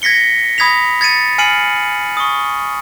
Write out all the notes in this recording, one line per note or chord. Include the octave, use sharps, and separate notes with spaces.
G#6 A#6 B6 C#7 G7
B5 D#6 G#6 A#6 B6 F7
G#6 A6 C#7 D#7
G#5 F6 C7 C#7 D#7 F#7
C#6 D#6